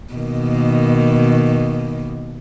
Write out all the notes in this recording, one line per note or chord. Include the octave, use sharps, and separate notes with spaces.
B2 D#3 A#3